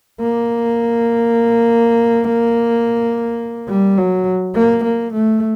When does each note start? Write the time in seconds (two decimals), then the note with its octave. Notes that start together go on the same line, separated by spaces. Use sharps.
0.20 A#3
3.69 G3
3.98 F#3
4.55 A#3
4.84 A#3
5.13 A3